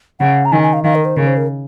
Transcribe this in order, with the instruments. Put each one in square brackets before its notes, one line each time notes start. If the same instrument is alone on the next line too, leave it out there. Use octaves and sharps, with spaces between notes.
[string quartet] C#3 [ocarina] F#5
[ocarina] A#5
[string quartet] D#3 [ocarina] G#5
[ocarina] G#5
F5
[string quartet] D#3 [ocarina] F5
[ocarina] A#4
C5
[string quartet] C#3 [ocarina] A#4
[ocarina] C5
A#4